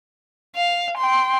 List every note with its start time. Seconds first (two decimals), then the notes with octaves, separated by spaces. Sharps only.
0.56 F5
0.98 G5 C6